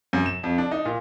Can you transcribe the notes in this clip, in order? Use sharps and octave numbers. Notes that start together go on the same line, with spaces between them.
F#2
E7
F2
D4
D#4
A#2